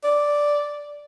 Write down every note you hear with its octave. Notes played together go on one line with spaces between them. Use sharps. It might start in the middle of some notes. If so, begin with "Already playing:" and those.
D5